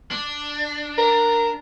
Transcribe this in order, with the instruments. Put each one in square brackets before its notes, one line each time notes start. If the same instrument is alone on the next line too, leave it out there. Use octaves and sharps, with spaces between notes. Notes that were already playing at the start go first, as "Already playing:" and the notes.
[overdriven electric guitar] D4
[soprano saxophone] A#4